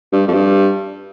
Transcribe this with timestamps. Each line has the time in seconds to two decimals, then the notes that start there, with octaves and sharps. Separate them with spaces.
0.12 G2
0.27 F2
0.33 G2